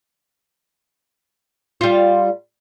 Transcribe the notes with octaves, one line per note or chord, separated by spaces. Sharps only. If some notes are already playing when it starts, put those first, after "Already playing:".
G3 F4